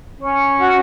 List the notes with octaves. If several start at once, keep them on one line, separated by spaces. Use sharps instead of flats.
C#4
F#4